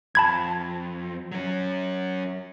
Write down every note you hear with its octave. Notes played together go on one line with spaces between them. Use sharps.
F2 A5 B5 G#6
F#3 C#4